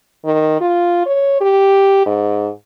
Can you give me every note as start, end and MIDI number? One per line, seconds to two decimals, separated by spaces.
0.25 0.60 51
0.61 1.02 65
1.06 1.38 73
1.41 2.03 67
2.06 2.49 44